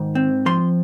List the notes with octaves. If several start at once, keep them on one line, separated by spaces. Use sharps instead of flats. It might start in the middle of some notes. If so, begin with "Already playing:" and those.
Already playing: G#2 D#3
C4
F3 C6